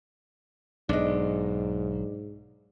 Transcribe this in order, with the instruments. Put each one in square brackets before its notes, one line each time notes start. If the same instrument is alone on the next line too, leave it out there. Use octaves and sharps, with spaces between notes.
[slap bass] B1 [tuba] G#2 [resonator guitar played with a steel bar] D4 D#5